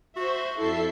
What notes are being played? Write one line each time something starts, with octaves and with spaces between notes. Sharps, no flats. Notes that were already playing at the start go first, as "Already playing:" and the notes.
F#4 C5 E5
F2 E4 A4 E5 C7